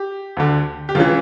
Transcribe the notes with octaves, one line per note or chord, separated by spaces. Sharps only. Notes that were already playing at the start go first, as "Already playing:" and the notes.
Already playing: G4
D2 D3
G4
C#2 C#3 E3 F4